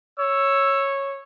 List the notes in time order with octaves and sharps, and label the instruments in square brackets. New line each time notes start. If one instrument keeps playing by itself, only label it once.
[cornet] C#5 [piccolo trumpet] E6